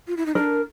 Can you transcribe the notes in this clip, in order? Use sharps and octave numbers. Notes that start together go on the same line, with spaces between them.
F4
E4
D#4
D4 A#4